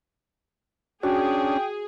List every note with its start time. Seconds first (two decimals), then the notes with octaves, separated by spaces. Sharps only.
1.03 C#4 D4 F#4 G#4 G5